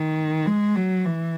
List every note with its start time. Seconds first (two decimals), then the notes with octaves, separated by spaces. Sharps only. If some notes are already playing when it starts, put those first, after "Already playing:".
Already playing: D#3
0.46 G#3
0.76 F#3
1.05 E3